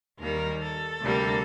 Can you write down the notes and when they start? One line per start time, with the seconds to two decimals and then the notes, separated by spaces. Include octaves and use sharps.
0.20 D#2 D#3 G3 A#3 A#4
0.61 A4
1.01 D2 C3 G3 A#3